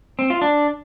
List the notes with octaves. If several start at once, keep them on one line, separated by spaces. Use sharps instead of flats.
C4
F4
D4